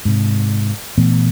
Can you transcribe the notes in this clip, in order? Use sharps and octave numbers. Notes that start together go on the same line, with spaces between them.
G#2 C3
A#2 E3 A3 B3